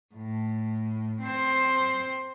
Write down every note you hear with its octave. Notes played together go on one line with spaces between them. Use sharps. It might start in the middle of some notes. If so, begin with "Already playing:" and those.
A2
C4 C5